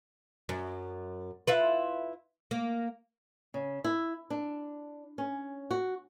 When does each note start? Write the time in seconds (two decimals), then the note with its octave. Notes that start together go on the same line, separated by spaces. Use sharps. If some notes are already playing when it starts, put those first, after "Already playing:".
0.49 F#2
1.47 E4 F4 B4
2.51 A#3
3.54 C#3
3.84 E4
4.30 D4
5.18 C#4
5.71 F#4